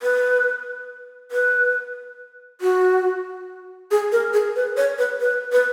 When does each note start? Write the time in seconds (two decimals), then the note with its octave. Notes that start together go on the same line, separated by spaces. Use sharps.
0.03 B4
1.32 B4
2.61 F#4
3.91 G#4
4.12 A#4
4.34 G#4
4.56 B4
4.77 C#5
4.98 B4
5.20 B4
5.52 B4